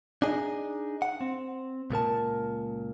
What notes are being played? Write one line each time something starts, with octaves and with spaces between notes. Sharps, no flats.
D4 D#4 G#4
F#5
C4
C#2 A#2 A#4 A5